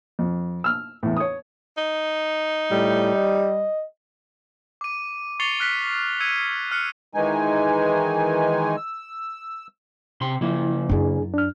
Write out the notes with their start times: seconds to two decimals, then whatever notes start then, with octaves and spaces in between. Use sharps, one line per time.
0.19 F2
0.64 E6 F6
1.03 E2 A2
1.17 C#5 D#6
1.78 D#4
2.71 A2 G3
3.15 D#5
4.81 D6 D#7
5.40 C#6 A6 C7 C#7 F7 G7
5.60 F6 F#6 B6 C7 D#7
6.20 E6 G#6 C#7 D#7
6.71 F6 F#6 C#7
7.14 D#3 E3 G#3 D#4 G#5
8.76 E6
10.21 C3 C6
10.41 C#3 F3 A#3 E4
10.89 F#2 D4 E4 G#4
11.34 D4 F6